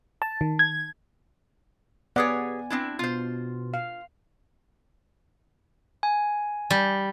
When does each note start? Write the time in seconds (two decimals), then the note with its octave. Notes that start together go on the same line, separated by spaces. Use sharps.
0.22 A5
0.41 D#3
0.59 G#6
2.16 B3 G4 G#4 C#5 D5 F#5 G#5
2.70 C4 D4 E4
2.99 B2 F4 C5
3.74 F5
6.03 G#5
6.70 G3